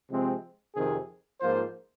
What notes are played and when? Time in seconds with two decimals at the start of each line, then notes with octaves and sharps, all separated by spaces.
0.11 C3 F3 G#3 C4
0.76 F2 C3 D#3 C4 G#4
1.41 G#2 F3 A#3 F4 C5